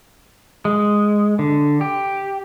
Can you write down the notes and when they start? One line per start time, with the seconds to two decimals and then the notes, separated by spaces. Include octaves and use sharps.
0.65 G#3
1.39 D3
1.81 G4